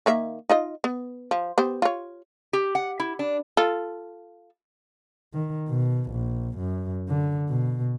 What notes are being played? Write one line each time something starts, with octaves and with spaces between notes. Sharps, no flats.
D#3 A#3 E5
D#4 F4 D#5
B3
F3
B3 G4 C5
F4 C#5
G4
F#5
E4
D4
F4 A4
D#3
B2
A#1
F#2
D3
B2